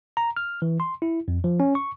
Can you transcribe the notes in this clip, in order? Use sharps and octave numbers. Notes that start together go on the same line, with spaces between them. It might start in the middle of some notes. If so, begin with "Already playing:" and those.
A#5
F6
E3
C6
E4
F2
F3
C#4
C#6